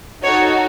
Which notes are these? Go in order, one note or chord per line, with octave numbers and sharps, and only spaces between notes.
D#4 F#4 A4 C#5